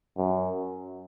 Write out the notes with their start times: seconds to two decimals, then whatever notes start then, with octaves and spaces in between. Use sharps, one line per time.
0.18 F#2